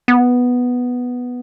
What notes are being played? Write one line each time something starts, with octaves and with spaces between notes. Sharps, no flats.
B3